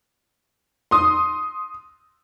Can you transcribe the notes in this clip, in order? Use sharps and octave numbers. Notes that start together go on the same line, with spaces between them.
C6 D#6